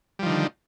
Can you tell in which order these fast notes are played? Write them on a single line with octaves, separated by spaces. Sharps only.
G3 F3 D#3 D3